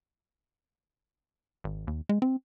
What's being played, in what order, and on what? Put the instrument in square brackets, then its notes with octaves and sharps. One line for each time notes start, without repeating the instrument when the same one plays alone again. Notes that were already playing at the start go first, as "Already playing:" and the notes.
[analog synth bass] G#1
D#2
G#3
C4